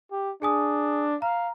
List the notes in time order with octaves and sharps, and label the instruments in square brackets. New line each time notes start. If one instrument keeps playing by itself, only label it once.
[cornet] G4
[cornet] D4 [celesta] G#4 G#5 D#6
[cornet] F5 [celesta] A#5